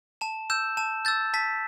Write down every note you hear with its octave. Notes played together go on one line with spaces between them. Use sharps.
A5 E7
E6 G6 E7
A5 E7
E6 G6 A6
A5 B6